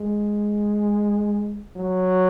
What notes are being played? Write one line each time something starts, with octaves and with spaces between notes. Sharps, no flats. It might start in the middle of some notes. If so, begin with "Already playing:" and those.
Already playing: G#3
F#3